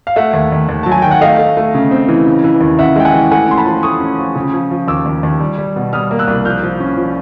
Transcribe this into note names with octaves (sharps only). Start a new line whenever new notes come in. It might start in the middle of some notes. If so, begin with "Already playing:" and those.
F5
A3 E5 F#5
D#2
D#2
D#2
F#3 A5
G#5
D#3 G5
F#5
A3 D#5 F5
A3
A3
C#3
C4
E3
C#3
E3
D#2
C#3 E5 F#5
G#3 G5
F#5 G#5
E3
A3 F#5 G#5
C#4 C6
A5 B5
F3
A3 C#6 D#6
C#4
F3
C#3
F3
F3
D#2 D6 E6
D#2
D#2
G3
G3
B2
G3 D#6 F6
A#3
E6 F#6
C2
F3 F6 G6
F3
C#4
F3